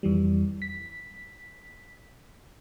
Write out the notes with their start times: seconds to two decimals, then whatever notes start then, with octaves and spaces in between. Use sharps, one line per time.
0.03 F2 E3 G3
0.62 B6